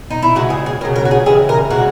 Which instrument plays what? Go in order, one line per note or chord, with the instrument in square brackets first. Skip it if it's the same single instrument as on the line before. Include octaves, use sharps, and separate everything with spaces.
[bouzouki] D#4
E4
C#3 G#3 F#4
G#4
G#4
F#3 A#4
C#3
A#4
F#4
G#4
C#3 E3 G#3 G#4
A#4
C#3 G#3 F#4